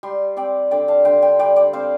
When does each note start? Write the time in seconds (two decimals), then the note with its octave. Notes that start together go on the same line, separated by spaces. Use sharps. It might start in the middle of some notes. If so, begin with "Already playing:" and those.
0.03 G3 G5 C6
0.37 C4 D5 G5
0.71 D3 D5 G5
0.88 F5 A5
1.05 D3 G5 C6
1.22 G5 C6
1.39 G3 D5 G5
1.56 D5 G5
1.73 C4 C5 F5